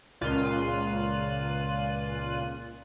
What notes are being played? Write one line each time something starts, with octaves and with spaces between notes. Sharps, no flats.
C#2 A#2 F4 F#6 D#7